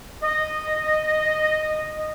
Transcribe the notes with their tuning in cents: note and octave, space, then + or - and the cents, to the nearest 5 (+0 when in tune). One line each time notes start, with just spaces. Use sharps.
D#5 -10